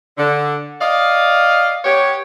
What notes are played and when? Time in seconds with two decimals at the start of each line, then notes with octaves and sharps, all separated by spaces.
0.18 D3
0.81 D5 D#5 F5
1.84 B3 G4 C#5